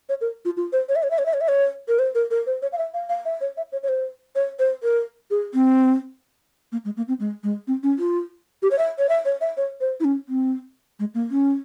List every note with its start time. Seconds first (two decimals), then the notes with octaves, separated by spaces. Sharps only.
0.09 C#5
0.21 A#4
0.45 F4
0.57 F4
0.73 C5
0.89 C#5
0.96 E5
1.03 C#5
1.11 E5
1.18 C#5
1.26 E5
1.34 C#5
1.41 E5
1.48 C#5
1.88 A#4
1.99 C5
2.15 A#4
2.31 A#4
2.46 C5
2.62 C#5
2.72 F5
2.78 E5
2.94 F5
3.09 F5
3.25 E5
3.41 C#5
3.57 E5
3.72 C#5
3.83 C#5
3.88 C5
4.36 C#5
4.59 C5
4.83 A#4
5.31 G#4
5.54 C4
6.72 A#3
6.85 G#3
6.97 A#3
7.08 C4
7.20 G#3
7.44 G#3
7.67 C4
7.83 C#4
7.99 F4
8.62 G4
8.71 C#5
8.78 E5
8.99 C#5
9.09 E5
9.25 C#5
9.41 E5
9.57 C#5
9.81 C5
10.00 E4
10.04 C#4
10.29 C4
10.99 G#3
11.15 A#3
11.31 C#4